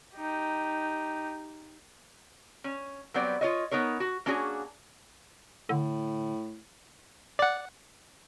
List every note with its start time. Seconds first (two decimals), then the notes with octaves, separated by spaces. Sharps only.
0.15 D#4 G4
2.64 C#4
3.14 F#3 G3 B3 C4 D5
3.41 F4 C#5 D#5
3.71 B3 D#4 A#4 C#5
4.00 F#4
4.26 A#3 C#4 D4 F#4 G#4
5.69 A2 D3
7.39 D5 F#5